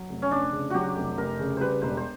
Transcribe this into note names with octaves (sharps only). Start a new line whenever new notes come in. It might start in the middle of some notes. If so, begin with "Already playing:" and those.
Already playing: F#3
F1
C#4
F1 D4
C#3
F#3 F#4 G4
F1
F1 A#4
C#3
G3 B4 C5
E1 C5
C5